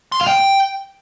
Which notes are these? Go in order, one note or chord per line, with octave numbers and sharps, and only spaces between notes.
C6
F5
G5